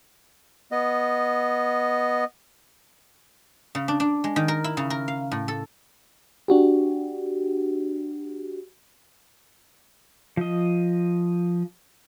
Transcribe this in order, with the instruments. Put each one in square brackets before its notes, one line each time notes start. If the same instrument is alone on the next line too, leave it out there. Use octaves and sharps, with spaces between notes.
[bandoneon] B3 D#5
[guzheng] C#3
D4
D4
G#3
D#3
A#4
E4
C#3
A#4
F5
A2
A4
[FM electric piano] D4 F#4 G4
[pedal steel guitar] F3 D#5